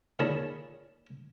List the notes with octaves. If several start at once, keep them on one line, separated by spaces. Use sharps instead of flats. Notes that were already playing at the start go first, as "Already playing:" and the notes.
A#2 D#3 G#4 C#5 A5 B5